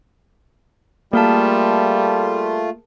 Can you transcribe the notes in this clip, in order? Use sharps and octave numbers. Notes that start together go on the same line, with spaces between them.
G3 A3 A#3 F4 G#4 A#4 A5